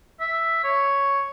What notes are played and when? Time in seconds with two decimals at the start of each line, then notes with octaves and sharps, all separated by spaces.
0.20 E5
0.64 C#5